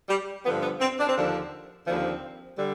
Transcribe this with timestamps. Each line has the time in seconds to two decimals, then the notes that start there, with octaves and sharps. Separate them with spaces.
0.09 G3
0.44 G2 D3 F3 B3
0.62 B3
0.80 C4
0.98 D4
1.07 C4
1.15 D#2 D3 F3 D4
1.86 D#2 D3 F3 C4
2.58 D3 G3